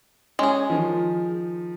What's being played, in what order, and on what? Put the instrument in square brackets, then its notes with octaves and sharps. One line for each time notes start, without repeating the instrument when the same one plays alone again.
[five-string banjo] G#3 G#4 [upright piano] C#4
[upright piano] D#3 F3